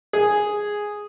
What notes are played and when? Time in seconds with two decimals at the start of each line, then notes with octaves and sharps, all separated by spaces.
0.13 G#4